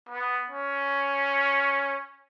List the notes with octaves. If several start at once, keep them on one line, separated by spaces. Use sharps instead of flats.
B3
C#4